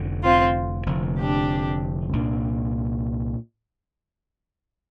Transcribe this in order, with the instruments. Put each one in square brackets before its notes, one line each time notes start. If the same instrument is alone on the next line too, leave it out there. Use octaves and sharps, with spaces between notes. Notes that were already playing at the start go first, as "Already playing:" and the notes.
Already playing: [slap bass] F1 F2 D3
[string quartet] C4 F4
[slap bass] F1 F2 D3 F3
[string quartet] D4 G4
[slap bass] C2 A#2 A#3 D4